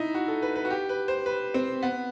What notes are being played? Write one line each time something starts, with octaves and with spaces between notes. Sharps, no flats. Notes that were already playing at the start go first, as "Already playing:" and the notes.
Already playing: D#4 E4
F#4
A4
B4
B4
F#4
G4
B4
C5
B4
C4
B3